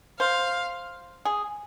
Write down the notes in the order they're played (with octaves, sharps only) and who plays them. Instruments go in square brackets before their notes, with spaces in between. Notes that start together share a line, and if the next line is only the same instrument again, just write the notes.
[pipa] C5 [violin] F5
[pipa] G#4